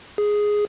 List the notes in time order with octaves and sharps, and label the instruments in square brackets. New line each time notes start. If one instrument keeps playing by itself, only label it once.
[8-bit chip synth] G#4